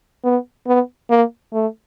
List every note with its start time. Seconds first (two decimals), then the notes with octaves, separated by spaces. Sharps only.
0.24 B3
0.67 B3
1.10 A#3
1.53 A3